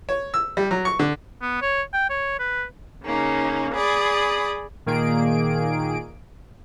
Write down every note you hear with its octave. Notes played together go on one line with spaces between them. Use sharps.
C#5
E6
G3
F#3
C#6
D3
B3
C#5
G5
C#5
B4
C#3 A#3 C#4 D#4
G#4 D5 B5 D#6
A#2 D#3 A#3 G#4 D7